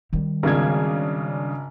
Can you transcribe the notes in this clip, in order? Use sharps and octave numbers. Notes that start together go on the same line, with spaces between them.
D#3 G3
G#1 C#3 D4 G#6